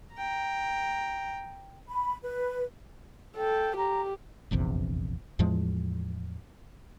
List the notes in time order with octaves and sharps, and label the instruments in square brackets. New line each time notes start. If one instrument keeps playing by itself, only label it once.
[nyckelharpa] G5 A#5
[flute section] B5
B4
[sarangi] A4 [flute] G5
[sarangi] G4 [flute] A#5
[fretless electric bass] F1 A#1 E2 C3
E2 A2 F3 G#3